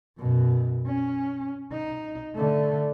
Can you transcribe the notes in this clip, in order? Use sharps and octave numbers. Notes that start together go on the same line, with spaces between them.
F#2 B2
C#4
D#4
D3 A3